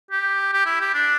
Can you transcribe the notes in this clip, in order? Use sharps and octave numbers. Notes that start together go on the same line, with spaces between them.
G4
G4
E4
G4
D4